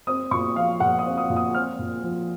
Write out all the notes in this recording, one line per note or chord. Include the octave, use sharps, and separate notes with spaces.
C4 D#6
A#2 C#6
F3 F5
A#2 F#5
D#6
C4
D#6
A#2
D#6
C4 F6
A#2
F3